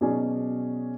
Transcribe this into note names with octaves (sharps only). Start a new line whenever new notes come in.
B2 F#3 C#4 G#4 D5